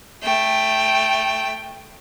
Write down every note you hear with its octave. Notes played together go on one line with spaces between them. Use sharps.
A3 G5